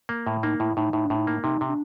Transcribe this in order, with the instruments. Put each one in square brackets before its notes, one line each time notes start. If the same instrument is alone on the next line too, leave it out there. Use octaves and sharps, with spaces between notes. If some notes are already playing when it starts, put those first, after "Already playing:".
[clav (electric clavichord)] A#3
A2
[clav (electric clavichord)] A#3 [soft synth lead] D#4
[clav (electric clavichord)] A2 [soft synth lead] E4
[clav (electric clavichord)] A2 [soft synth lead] D#4
[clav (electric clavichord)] A2 [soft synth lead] D#4
[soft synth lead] D4
[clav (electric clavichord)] A2
[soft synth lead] D#4
[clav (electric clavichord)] A#3
[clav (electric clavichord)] C3 [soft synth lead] D#4
[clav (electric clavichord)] C3
[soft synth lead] D4